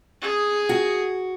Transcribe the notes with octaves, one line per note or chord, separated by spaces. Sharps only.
G#4 D#6
F#4